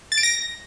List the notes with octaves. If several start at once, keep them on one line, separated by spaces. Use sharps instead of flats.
A6
D7
A#6